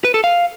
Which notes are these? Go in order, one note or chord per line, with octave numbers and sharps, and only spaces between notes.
B4
A4
F5